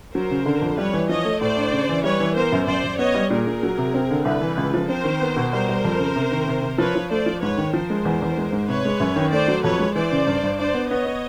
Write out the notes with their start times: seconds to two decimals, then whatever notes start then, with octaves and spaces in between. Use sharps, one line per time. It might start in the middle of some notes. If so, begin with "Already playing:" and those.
0.14 F#3 A#4 C5
0.31 C#3
0.46 D3
0.62 F2
0.77 G3 B4 C#5
0.93 E3
1.09 F3 C#5 D#5
1.25 A3
1.41 A2 C5 D5
1.57 D4
1.72 C#3
1.89 E3
2.04 G3 B4 C#5
2.20 E3
2.36 B3 A#4 C5
2.52 F#2
2.67 F#2 C5 D5
2.83 F#2
2.99 B3 C#5 D#5
3.14 G3
3.30 A#2 G#4 A#4
3.47 A#2
3.63 F#3
3.78 C3
3.94 C4
4.11 D3
4.25 C2 A4 B4
4.41 E3
4.57 C#2
4.74 F3
4.89 C4 A#4 C5
5.04 D#3
5.21 B3
5.36 B2
5.52 G3 A#4 C5
5.69 G3
5.84 F2
5.99 C#3
6.16 C3
6.32 D#3
6.48 C3
6.62 C3
6.78 F3 B4 C#5
6.95 F3
7.11 A3 C5 D5
7.26 F3
7.42 G#2 B4 C#5
7.57 D#3
7.73 F3 A#4 C5
7.90 G#3
8.05 E2
8.22 E2
8.37 G#3
8.53 G#2
8.69 C3 B4 C#5
8.85 G#3
9.00 F#2
9.16 D#3
9.32 A3 C5 D5
9.48 F#3
9.63 F2 B4 C#5
9.79 G#3
9.95 E3 C5 D5
10.12 C#3
10.27 G2
10.43 G2
10.59 D4 C5 D5
10.74 B3
10.90 B3 C#5 D#5
11.06 B3